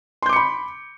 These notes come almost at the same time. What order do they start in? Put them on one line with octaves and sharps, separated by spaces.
C6 G6 D6 C#7 B5